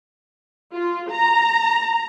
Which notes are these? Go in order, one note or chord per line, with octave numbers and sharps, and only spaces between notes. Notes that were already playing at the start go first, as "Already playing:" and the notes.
F4
A#5